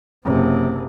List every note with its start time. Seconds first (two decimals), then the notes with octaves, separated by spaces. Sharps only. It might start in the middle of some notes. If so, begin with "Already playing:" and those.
0.25 F#1 C3